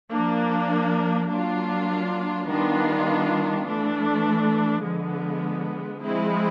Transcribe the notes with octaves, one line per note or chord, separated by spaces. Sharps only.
F3 A#3 D4
F#3 A#3 D4 F4
D#3 G3 B3 D4 F4
E3 A3 D4
D3 F3 G#3 B3
F3 G#3 C4 E4